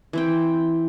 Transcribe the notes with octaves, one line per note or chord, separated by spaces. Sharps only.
E3 C4 G5